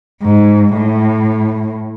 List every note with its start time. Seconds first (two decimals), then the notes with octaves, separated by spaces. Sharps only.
0.22 G#2
0.75 A2